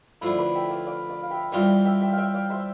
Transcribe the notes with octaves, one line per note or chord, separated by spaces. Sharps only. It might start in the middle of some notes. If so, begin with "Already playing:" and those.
D3 F3 A3 E4
B4 D5
E5 G5
D5 F5
D5 F5
D5 F5
F5
E5 G5
E3 G3 C4 F4 C5 E5
G5
D5 F5
E5 G5
E5 G5
F5
E5 G5
D5 F5
C5 E5